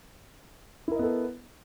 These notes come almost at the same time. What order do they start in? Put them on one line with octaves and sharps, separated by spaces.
E4 A#4 D#5 B3 A4